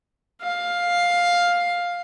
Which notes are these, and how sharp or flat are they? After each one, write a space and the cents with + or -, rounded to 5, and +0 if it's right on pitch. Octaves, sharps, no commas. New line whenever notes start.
F5 +10